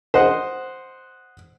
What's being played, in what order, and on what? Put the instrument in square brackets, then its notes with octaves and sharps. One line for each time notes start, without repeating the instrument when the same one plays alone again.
[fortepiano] C5 D#5 F#5